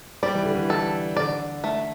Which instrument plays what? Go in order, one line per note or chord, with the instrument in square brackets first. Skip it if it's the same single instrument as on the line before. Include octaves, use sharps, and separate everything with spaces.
[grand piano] G3 [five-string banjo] D5
[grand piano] E3
D3
E3
[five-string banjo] A4
[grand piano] D3 [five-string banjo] D5
[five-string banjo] A3